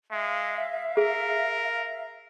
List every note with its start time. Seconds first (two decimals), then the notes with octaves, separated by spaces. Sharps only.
0.11 G#3 E5 F5
0.97 G#4 A#4